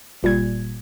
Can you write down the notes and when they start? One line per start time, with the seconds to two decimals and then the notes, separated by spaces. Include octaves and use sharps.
0.23 G1 A#2 G3 G#6